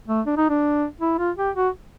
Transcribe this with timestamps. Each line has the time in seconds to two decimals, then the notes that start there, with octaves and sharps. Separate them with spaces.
0.08 A3
0.26 D4
0.37 D#4
0.49 D4
1.00 E4
1.18 F4
1.37 G4
1.56 F#4